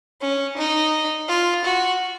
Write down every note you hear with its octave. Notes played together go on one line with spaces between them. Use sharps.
C#4
D#4
F4
F#4